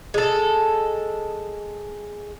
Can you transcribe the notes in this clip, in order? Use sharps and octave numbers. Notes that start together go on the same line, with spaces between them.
G#3 A4